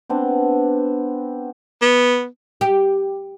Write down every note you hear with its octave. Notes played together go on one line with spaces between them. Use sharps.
B3 C4 D4
B3
G4